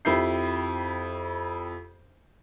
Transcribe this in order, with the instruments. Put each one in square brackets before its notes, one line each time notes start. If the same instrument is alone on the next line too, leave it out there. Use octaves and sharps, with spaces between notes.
[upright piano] F2 E4 G4 B5 G6 C7